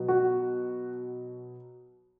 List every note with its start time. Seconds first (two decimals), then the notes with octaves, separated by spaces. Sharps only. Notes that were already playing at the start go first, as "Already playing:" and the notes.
Already playing: B2 F#3
0.08 F#4